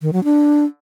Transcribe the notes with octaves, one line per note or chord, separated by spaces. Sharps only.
D#3
F#3
D4